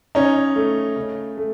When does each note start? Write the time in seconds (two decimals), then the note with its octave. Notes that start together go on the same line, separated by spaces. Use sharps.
0.15 C#3 C#4 D#4
0.56 A3
0.96 C#3
1.37 A3